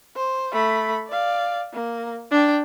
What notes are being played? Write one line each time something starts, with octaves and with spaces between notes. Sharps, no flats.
C5
A3 B5
D5 F5
A#3
D4 G5